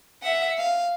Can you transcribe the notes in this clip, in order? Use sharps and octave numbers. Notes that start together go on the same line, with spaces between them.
E5 F#5
F5